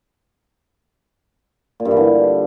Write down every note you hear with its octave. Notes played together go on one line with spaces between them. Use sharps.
A#2
G2
E3
D3